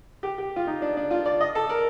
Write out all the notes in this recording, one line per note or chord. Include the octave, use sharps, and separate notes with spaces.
G4
G4
F4
D#4
D4
D4
F4
D5
D#5
A4
A#4